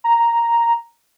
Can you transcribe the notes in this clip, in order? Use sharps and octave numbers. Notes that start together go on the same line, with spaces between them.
A#5